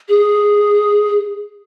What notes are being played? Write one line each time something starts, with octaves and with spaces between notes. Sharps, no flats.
G#4